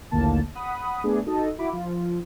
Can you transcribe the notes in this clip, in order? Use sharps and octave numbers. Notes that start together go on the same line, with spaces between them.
A#1 D#2 A2 D3 A#3 A5
F#5 B5 D#6
A3 B3 D4 G#4
D#4 F#4 A4 D#5
E4 F#4 B5 D6
F3 F4